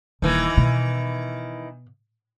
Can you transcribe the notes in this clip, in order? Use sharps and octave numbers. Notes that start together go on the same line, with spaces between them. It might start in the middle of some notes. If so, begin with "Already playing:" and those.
D#1 D#3 E3
B2